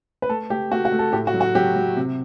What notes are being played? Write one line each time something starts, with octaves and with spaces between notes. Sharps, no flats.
B4
A3 A4
A3 G4
A3 F#4
F#4
A3
A4
A2 G4
F#4
F#3
F#4
F#3 G4
F#3
C3